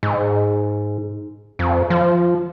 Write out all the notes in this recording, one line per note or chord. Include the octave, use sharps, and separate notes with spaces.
G#2
F2
F3